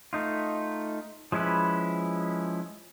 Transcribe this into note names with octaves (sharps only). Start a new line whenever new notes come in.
A3 D#4 F4
F3 G#3 C#4 E4 B4